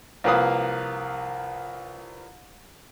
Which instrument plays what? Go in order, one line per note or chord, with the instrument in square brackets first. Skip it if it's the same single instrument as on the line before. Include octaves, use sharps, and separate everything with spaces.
[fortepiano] C2 F3 A#3 B4 F5 D#6